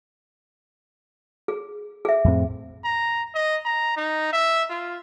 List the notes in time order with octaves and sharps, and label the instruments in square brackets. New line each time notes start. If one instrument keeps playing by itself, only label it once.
[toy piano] G#4
G#4 E5
[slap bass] F2 A2 C4
[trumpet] A#5
D#5
A#5
D#4
E5
F4